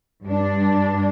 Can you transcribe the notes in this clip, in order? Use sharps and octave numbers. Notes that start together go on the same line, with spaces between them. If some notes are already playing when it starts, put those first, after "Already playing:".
G2 G3 D4